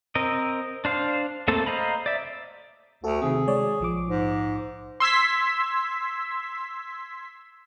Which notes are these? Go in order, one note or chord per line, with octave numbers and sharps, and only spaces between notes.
C4 A#4 D#5
D4 C5 F5
A3 A#3 C4 A4 A5
C5 D#5 F5 A#5 B5
D5 E5
D2 F#4 A4
C3 D#3 C4 G#4
G#3 C#5 D5
A#1 F3 D6
G#2
C6 E6 G#6 B6